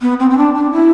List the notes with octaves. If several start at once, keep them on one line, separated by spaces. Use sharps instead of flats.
B3
C4
C4
D4
D4
E4